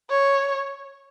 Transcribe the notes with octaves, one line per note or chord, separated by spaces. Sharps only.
C#5